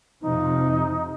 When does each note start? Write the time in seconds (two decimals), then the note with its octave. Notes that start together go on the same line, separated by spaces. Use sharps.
0.22 F2 C3 F3 D#4